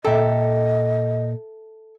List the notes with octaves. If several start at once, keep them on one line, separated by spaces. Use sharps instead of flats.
A#2 A4 D#5 E5 G5 A#5